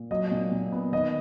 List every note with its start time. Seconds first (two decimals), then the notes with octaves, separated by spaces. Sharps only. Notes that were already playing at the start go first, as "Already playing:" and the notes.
Already playing: A#2
0.11 F#3 D#5
0.32 A#2
0.52 A#2
0.72 B3
0.92 D#3 D#5